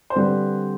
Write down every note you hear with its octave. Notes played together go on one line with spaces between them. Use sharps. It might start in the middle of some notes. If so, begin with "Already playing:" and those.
C5
D3 G3 C4 B4